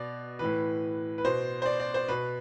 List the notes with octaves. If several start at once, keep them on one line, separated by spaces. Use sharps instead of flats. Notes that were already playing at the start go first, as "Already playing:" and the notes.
Already playing: B2 D5
A2 E3 B4
B4
B2 C5
C5
D5
D5
C5
B2 B4